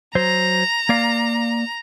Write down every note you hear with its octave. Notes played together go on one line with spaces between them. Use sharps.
F#3 C5 A#5
A#3 D5 F5